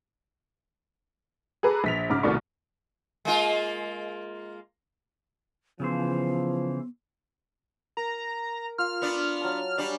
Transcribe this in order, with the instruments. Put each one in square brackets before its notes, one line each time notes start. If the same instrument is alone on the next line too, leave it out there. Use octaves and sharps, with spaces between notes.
[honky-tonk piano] G#4 A4 B4 A#5 D6
A#1 B6 F7
G#2 C#3 D6 F6
C2 B2 D#3 A3 D5 C#6
[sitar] G#3 A#3 F4
[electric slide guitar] C#3 E3 C5 [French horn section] F3 [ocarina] B3
[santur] A#4 [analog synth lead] A#5
[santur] F4 [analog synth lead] F6
[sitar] B3 D4
[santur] F#3 A5
[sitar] G3 D4 [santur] C#5 G#5